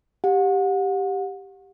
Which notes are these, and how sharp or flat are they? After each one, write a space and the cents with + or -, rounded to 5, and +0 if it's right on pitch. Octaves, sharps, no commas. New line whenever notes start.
G4 +0 F#5 -35